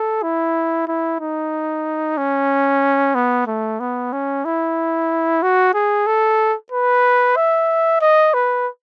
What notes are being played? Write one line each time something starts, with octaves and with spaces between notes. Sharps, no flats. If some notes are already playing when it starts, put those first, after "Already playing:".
Already playing: A4
E4
E4
D#4
C#4
B3
A3
B3
C#4
E4
F#4
G#4
A4
B4
E5
D#5
B4